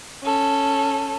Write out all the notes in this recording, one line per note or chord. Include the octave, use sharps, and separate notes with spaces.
C#4 A4